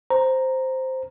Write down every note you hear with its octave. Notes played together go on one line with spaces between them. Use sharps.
C5 A#5